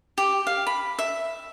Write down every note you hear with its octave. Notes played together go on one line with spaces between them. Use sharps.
G4
F5
B5
E5